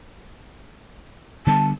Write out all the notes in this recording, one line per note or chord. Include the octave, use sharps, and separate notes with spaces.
D3 G3 B3 A5